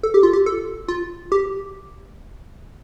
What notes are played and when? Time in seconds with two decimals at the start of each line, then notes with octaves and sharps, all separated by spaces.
0.03 A4
0.14 G4
0.23 F4
0.33 G4
0.46 A4
0.88 F4
1.32 G4